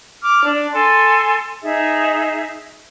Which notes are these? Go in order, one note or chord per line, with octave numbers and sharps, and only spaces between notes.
D6 F6
D4
A4 G#5 C6
D#4 G#4 E5